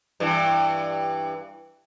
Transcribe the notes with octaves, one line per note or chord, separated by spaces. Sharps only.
G2 E3